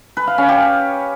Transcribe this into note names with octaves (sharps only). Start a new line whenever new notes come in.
B4
F5
C#4
G4